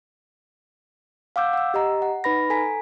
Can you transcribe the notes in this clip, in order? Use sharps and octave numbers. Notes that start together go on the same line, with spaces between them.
F5 F#5 D6 E6 G6
F#5 E6
G4 D#5 A#5
F#5
D#4 B4 B5 A#6
A4 G#5 A#5 B6